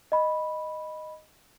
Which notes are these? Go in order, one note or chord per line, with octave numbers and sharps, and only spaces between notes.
D#5 B5